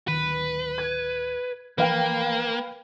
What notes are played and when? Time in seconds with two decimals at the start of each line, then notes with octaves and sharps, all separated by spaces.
0.08 D1 D#3 B4
0.78 G#6
1.78 E3 F3 A#3 B4 F5 G5